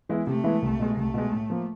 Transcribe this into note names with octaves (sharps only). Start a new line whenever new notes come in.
E3 G#3 B3 E4
C3 A3
E3 G#3 B3 E4
C2
B2 G#3
C2 A3
B2 G#3
A2
F3 A#3